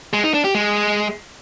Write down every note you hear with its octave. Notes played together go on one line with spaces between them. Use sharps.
G#3
D#4
D4
G4
G#3